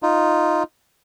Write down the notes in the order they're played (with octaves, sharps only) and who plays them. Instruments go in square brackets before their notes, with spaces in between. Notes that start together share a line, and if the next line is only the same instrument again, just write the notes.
[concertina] D#4 F4